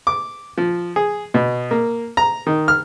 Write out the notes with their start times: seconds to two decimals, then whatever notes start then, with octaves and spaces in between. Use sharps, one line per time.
0.07 D6
0.58 F3
0.96 G#4
1.34 B2
1.71 A#3
2.17 A#5
2.47 D#3
2.68 F6